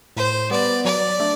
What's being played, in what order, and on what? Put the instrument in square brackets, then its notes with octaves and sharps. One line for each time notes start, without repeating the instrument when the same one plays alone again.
[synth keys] A2 [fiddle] C5
[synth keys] G3 B3 [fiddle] D5
[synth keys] F#3 [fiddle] D5
[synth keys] A3 D4